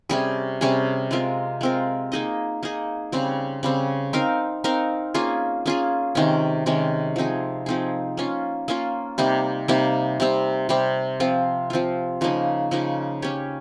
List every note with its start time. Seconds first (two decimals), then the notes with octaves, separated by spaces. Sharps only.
0.09 C3 G3 C#4 G#4
0.61 C3 G3 C#4 G#4
1.11 G#3 C4 F4 A#4
1.61 G#3 C4 F4 A#4
2.12 A#3 D#4 G#4 D#5
2.63 A#3 D#4 G#4 D#5
3.12 C#3 G3 C4
3.63 C#3 G3 C4
4.13 C4 D#4 A#4 F5
4.64 C4 D#4 A#4 F5
5.14 A#3 C#4 F4 G#4
5.66 A#3 C#4 F4 G#4
6.15 C3 D#3 G#3 C#4
6.66 C3 D#3 G#3 C#4
7.16 F3 C4 D#4 G#4
7.66 F3 C4 D#4 G#4
8.17 A#3 C#4 F4
8.68 A#3 C#4 F4
9.18 C3 G3 A#3 D#4
9.68 C3 G3 A#3 D#4
10.20 C3 G3 C4
10.69 C3 G3 C4
11.20 F3 C4 F4
11.70 F3 C4 F4
12.21 C#3 F3 A#3 D#4
12.71 C#3 F3 A#3 D#4
13.22 C#4 G4 C#5